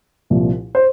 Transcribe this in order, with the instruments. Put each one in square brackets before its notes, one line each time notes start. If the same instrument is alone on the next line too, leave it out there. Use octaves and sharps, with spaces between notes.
[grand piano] C2 A#2 F3
C5